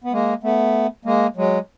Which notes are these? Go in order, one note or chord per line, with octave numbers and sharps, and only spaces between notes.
B3
G#3 A#3
A3 B3
G#3 A#3
F#3 G#3